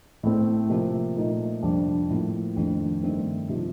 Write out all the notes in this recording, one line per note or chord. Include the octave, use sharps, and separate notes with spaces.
A2 A3 C4
C3 F3 A#3
A#2 A3 D#4
F2 C3 G3 D4
A2 F3 A#3
F2 D#3 A3 D4
G2 D#3 A3 C4 D#4
C3 F3 C4 D#4